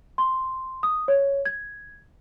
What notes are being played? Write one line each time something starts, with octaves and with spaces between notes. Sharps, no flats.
C6
D#6
C#5
G#6